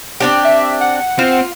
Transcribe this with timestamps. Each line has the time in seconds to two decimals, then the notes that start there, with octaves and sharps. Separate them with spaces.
0.20 C4 D4 G4
0.45 E5
0.81 F#5
1.19 C4 F4